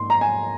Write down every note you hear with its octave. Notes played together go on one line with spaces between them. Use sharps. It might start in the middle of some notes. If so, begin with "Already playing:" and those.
Already playing: G#2 A#3 C6
A#5
G#5